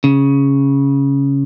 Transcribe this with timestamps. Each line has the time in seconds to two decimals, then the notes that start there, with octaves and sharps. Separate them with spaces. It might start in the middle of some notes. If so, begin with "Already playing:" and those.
0.04 C#3